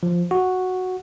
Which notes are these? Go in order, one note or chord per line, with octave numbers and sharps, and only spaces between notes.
F3
F#4